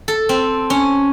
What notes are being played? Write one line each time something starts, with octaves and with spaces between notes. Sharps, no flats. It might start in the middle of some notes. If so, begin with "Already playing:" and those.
A4
C4
C#4